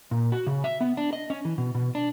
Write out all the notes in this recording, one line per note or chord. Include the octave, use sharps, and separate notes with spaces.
A#2
F#4
C#3
E5
B3
D4
D#5
C#4
E3
B2
B2
D4